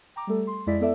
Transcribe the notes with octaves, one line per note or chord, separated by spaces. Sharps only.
G5 A#5 D6
G3 A3 A4
C6
F2 G#3 E4 D5 B6
B3 E4 A4 D5 E5